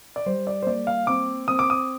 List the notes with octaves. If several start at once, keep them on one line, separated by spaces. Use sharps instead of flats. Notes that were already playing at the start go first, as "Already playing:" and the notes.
D5
G3 C5
D5
C5
A#3 D5
F5
C4 D6
C4 D#6
D6
D#6